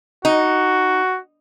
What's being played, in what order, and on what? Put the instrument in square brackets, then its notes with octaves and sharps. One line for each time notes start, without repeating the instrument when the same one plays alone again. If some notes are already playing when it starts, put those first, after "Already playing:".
[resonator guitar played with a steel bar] D#4 [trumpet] F#4